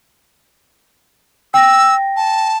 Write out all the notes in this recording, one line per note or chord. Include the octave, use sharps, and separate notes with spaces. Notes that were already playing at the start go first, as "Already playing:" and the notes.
G5 E6 A#6
A5